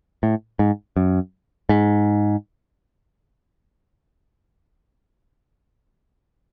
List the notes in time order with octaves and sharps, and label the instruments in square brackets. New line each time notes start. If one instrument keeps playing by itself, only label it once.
[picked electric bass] A2
G#2
F#2
G#2